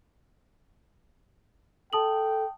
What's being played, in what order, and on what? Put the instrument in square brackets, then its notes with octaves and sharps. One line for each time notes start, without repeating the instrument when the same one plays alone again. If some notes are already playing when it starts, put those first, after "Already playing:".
[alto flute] A4 [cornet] G5 [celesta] A5 D#6 F#7